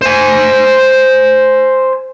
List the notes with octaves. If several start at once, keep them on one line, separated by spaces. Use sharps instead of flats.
C5 G#5